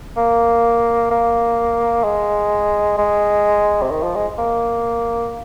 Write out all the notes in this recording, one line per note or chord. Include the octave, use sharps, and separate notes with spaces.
A#3
A#3
G#3
G#3
C3
D#3
F3
G#3
A#3